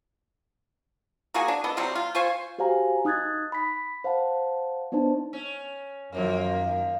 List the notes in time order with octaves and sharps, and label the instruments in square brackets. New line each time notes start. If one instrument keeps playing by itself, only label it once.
[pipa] A#3 F#4 G#4 G#5
D4
B3 A4 D#5
C3 F#3 G3 C4
F4
F4 C5 G#5 C#6
[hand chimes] F#4 G4 C5 F5 G#5 A#5
D#4 D#6 F#6 G#6 A6
B5 B6
C5 F5 F#5 A5
B3 D4 D#4 C5 A5
[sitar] C#4
[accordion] F#2 [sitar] D#3 F3 A#3